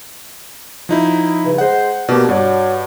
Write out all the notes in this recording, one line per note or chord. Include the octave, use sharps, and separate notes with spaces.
F3 D#4 E4
G2 C#3
G#3 C5 F#5
B2 A#3 D4 G4
G2 F#4 C#5 D5